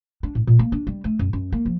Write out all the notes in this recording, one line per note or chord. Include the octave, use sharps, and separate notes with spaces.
D4
A2
A#2
A#3
D4
G3
A3
F#2
F#2
A#3
F3